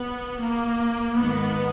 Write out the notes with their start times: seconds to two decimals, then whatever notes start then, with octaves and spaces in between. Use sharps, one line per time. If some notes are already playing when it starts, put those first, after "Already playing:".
Already playing: B3
0.42 A#3
1.17 G#2 D#3 B3